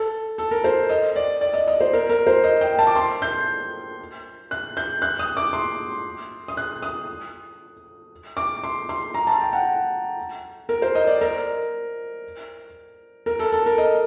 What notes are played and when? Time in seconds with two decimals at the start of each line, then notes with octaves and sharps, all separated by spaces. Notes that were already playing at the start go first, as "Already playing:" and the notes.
Already playing: A4
0.38 A4
0.51 A#4
0.64 C5
0.89 D#5
1.16 D5
1.41 D5
1.54 D#5
1.68 D#5
1.81 C5
1.93 A#4
2.09 A#4
2.27 C5
2.44 D#5
2.61 G5
2.79 A5
2.87 D6
2.95 C6
3.22 G6
4.51 F#6
4.77 G6
5.02 F#6
5.19 D#6
5.37 D6
5.53 C6
6.48 D#6
6.57 F#6
6.82 D#6
8.37 D6
8.64 C6
8.89 C6
9.14 A#5
9.27 A5
9.41 G5
9.53 F#5
10.69 A#4
10.82 C5
10.95 D#5
11.07 D5
11.21 A#4
13.26 A#4
13.39 A4
13.52 A4
13.66 A#4
13.78 D#5